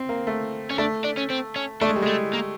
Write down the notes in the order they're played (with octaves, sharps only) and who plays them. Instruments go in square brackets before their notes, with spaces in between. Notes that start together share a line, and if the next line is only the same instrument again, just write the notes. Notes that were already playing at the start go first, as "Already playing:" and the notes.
Already playing: [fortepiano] C4
A#3
A3
[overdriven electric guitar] C#4
[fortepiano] A3 [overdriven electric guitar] D4
[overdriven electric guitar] D4
C#4
C4
C#4
[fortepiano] A3 [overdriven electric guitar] D4
[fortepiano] G#3
G3
[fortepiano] G#3 [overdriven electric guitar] A3
[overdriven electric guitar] A#3